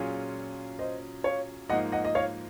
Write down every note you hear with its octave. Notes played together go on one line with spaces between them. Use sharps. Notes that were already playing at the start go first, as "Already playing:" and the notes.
Already playing: A#2 F#3 C#4 F4 G#4
C5 D#5
C#5 F5
G#2 F3 A#3 D#4 D#5 F#5
D#5 F#5
D#5
C#5 F5